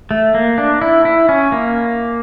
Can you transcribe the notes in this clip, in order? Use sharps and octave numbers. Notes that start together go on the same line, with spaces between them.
A3
A#3
D4
E4
E4
C#4
A#3